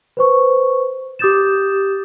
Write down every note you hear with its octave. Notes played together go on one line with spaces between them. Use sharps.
B4 C5 C#6
G4 D6 D#6 G6 A6 E7